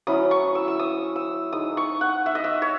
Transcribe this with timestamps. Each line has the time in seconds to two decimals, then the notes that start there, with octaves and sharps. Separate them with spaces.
0.07 F#3 C#4 E4 D#6
0.31 C#6
0.55 E6
0.68 E6
0.79 D#6
1.16 E6
1.52 G#3 D#4 D#6
1.77 C#6
2.01 F#5
2.26 E5
2.35 D#5
2.44 E5
2.62 C#5